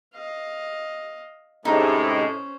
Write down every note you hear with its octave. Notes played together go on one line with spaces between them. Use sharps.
D#5 F5
A2 C3 G#3 C#4 D#4 C5